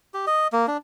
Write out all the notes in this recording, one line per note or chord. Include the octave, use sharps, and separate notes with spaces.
G4
D#5
A#3
D4